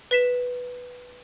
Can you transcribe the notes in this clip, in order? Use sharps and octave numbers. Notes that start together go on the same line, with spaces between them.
B4 B6 E7